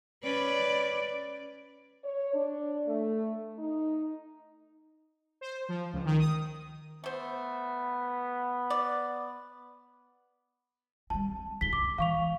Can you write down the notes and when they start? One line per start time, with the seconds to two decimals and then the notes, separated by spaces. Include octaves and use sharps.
0.24 C#4 B4 D5
2.04 C#5
2.34 D4
2.87 A3
3.59 D#4
5.41 C5
5.69 F3
5.93 C#2
6.05 D#3
6.19 D#6
7.04 A3 B3 C5
8.70 D5
11.10 G3 C4 A5
11.61 F1 C#2 B6 G7
11.73 C#3 D6
11.98 E3 G#3 F5 C#6 F7